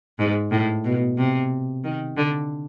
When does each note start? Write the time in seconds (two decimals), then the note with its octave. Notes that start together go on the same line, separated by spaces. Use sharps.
0.19 G#2
0.51 A2
0.85 B2
1.18 C3
1.84 D#3
2.17 D3